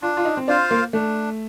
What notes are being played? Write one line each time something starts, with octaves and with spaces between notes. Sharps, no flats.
D4 F4
F4
D#4
C4
D4 F4 C5 F5
A#3
A3 D4